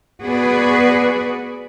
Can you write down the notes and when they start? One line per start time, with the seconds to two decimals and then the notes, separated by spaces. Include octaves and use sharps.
0.23 B3 F#4 G#4 B4 D5